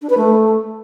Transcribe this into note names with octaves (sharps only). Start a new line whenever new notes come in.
D4
B4
A3